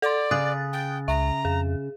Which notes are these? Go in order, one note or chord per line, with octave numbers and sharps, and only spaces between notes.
A4 D5 C6
C#3 D#6 F#6 A6
G5
C#2 E5 A#5
F2 G#4